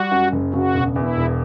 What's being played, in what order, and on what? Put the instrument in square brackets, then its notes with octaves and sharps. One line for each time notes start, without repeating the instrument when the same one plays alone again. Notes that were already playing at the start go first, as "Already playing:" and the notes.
Already playing: [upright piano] G3 [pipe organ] F#4
[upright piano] F#2
F#1
[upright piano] C#3 [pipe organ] F#4
[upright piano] E1
[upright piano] E2 [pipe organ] E4
[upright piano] E1